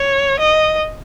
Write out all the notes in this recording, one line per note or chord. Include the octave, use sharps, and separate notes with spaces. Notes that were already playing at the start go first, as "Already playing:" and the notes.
Already playing: C#5
D#5